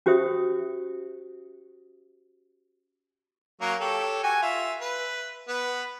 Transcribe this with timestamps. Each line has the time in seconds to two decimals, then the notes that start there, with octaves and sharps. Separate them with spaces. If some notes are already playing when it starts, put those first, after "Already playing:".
0.06 C#4 F#4 G4 C5 E5 D#6
3.61 F#3 A#3 C#4
3.80 G4 A4 C#5
4.24 F#4 G4 G#5
4.42 F4 E5
4.81 B4
5.48 B3 B4